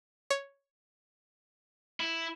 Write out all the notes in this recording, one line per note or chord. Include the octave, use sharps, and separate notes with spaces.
C#5
E4